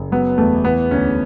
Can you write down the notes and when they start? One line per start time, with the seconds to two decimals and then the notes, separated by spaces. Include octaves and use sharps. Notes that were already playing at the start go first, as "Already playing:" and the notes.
Already playing: F#1
0.11 F#3 B3
0.38 E2 A3
0.64 E3 B3
0.91 D2 C#4